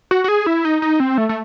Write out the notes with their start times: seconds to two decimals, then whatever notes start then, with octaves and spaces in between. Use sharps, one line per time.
0.11 F#4
0.24 F#4
0.28 G#4
0.46 E4
0.65 D#4
0.82 D#4
1.00 C4
1.18 A3
1.29 A3